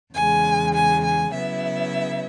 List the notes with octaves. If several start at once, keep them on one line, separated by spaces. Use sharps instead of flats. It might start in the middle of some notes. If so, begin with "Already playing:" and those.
E2 C#3 G#3 G#5
G#5
G#5
C#3 F#3 B3 E4 E5